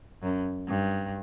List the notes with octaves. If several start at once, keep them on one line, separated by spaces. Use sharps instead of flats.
F#2
G2